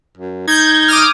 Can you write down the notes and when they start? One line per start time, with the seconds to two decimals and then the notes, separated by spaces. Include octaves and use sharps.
0.18 F#2
0.47 D#4 G6 G#6
0.88 D6 D#6 F6